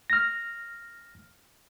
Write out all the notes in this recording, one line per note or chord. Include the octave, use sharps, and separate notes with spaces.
F6 A#6